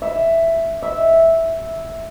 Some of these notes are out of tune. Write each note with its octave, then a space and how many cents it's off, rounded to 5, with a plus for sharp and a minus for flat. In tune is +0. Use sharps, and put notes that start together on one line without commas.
E5 +5
E5 -5